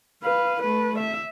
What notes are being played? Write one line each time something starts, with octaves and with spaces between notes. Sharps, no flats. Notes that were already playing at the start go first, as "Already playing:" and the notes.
B4 F5
A3 B4
E5